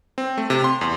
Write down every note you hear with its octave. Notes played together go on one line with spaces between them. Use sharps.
C4
A3
C3
C6
E2